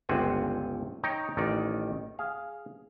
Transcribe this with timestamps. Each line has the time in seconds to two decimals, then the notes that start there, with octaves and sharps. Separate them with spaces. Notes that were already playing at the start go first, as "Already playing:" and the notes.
0.09 G1 C#2 C4 F#5 G#5
1.03 D#4 C#5 G5 A#5
1.37 A1 D#3 D#4 D5
2.19 G#4 F5